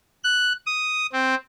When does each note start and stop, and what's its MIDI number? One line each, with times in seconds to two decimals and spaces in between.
0.24 0.53 90
0.66 1.06 87
1.12 1.35 60